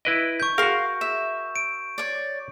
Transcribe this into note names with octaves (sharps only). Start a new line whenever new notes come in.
E4 B4 D#5 D7
C#6 G6
F#4 G#4 A#4 F5 C6
E5 E7
D7
C#5 D5